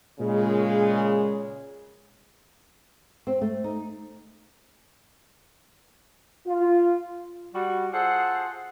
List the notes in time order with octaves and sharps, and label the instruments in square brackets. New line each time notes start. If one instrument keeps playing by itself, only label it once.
[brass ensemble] A#2 C#3 G#3
[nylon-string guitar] C4
A3
D#4
[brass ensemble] F4
[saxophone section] G3 F#4
F4 G#4 A4 C5 F#5